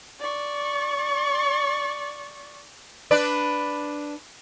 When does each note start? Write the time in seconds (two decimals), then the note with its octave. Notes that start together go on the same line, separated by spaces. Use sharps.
0.20 D5 C#6
3.11 D4 B4 D5